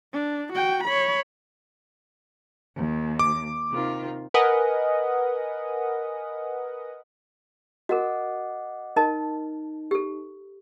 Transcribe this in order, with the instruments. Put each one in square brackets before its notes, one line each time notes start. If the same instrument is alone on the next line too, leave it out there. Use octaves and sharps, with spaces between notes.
[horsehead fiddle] D4
F#4 G5
C#5 B5
[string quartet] D#2
[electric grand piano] D6
[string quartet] C3 D#3 F4
[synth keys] A#4 B4 D#5 F#5 G#5 D#6
[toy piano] F#4 A#4 [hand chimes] D#5 F#5 D6
[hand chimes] D#4 [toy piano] A#4 D#5 A5
[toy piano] G4 A4